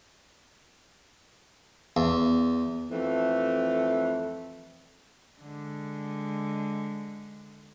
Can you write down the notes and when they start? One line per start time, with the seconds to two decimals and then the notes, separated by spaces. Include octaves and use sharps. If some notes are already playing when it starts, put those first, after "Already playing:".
1.97 E2
2.91 F2 E3 A3
5.41 D3 G#3